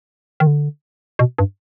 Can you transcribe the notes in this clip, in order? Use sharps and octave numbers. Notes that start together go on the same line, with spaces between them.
D#3
D3
B2
G2